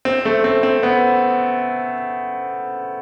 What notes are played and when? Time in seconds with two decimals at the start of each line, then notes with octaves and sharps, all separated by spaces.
0.05 C4
0.25 A3
0.44 C4
0.63 C4
0.83 B3